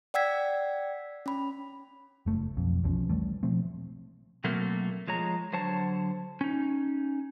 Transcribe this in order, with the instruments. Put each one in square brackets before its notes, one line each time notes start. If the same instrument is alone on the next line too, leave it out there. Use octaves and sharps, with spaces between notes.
[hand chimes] D5 F#5 G5 E6 G#6 B6
C#4 B5
[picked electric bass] F#1 A3
B1 F2
B1 E2 F3 C#4
E3 G3 A3
B2 F3 A3 C4
[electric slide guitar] B2 F#3 A3 A#3 C4
F3 G#3 C#5 A#5
D3 F#3 C5 C#5 A5
C#4 D#4